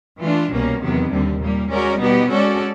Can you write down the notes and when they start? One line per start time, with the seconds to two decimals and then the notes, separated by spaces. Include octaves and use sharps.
0.20 E3 A3 D4 F4
0.51 C2 B2 G3 A#3 C#4
0.81 E2 C3 D#3 F#3 B3
1.11 D#2 D3 G3 C4
1.40 A#2 G3 A#3
1.70 G#3 C#4 F#4 A#4 D5
2.00 B2 G3 B3 D#4 G4
2.31 G#3 C#4 F#4 A4 D5